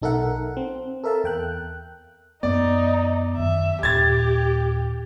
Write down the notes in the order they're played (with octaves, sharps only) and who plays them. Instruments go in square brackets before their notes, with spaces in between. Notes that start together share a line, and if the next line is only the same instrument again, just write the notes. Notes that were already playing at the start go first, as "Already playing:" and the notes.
[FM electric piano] B1 D#4 A4 A#4 E5 F#5
C4
A4 A#4 E5 F5 A5
E2 G5 F#6
[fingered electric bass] F#2 B3 [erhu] D#4 [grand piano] D5
[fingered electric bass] F#2 D#3 [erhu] E5
[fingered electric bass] D#2 A#2 [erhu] G4 [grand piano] G#6 A6